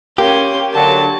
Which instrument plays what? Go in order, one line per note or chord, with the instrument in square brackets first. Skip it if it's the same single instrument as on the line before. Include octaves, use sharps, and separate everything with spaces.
[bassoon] A#3 [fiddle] C#4 C6 [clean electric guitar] G4
[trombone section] D3 F#3 [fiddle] A5